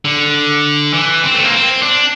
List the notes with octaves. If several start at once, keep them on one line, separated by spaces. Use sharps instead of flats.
D3
E3
C4
A3
A#3
C4
D4